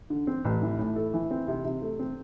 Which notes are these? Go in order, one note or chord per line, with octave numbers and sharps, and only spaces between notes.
D3
C4
A1
E3
A2
A4
E3
C4
C3
C3
A3
C4